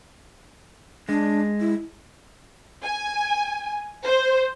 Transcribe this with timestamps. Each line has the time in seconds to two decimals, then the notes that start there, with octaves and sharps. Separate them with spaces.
1.09 G#3 D4
1.60 E4
2.83 G#5
4.04 C5